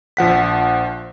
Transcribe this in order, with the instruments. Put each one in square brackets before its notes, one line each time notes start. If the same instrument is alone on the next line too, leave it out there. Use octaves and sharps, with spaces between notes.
[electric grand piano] A#1 F3 F#5 B6